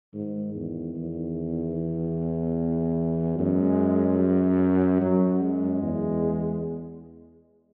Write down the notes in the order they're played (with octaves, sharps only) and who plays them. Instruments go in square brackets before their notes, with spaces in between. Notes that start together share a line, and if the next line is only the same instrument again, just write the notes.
[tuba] G#2 [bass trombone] D#3
[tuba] E2
E2
[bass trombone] E3
[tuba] F#2 [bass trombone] G#3
[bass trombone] F#3
[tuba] F#2 [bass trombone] F#3
[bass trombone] G#3
[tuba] E2